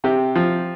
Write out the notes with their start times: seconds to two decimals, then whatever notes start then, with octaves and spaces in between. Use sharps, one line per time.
0.04 C3 G4
0.35 F3